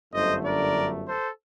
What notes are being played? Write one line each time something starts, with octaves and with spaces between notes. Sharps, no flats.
G1 F#2 D3 A3 C5 D#5
A#4 D5
A4 C5